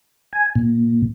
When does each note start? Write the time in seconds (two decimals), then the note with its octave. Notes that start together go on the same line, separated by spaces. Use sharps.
0.33 G#5
0.56 A#2